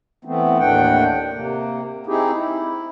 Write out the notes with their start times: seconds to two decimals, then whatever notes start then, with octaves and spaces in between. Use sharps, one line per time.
0.25 E3 A3 B3 C4
0.59 D#2 A2 D#3 D4 F#5 G5
1.33 C3 A#3
2.07 C4 D#4 E4 G4 G#4
2.35 E4